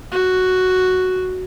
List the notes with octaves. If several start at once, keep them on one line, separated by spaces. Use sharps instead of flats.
F#4